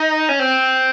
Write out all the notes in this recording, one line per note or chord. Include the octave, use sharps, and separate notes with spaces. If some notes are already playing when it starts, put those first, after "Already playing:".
Already playing: D#4
C#4
C4